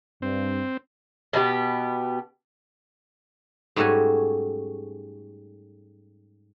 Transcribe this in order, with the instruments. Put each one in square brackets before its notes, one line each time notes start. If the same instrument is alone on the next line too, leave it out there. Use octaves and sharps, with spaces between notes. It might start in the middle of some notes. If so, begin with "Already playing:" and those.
[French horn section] G2 [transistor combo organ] C4
[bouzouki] B2 B3 D#4 G4
[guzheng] G#2 G3 A3 C#4 F#4 G#5